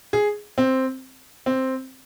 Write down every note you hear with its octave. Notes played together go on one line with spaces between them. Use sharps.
G#4
C4
C4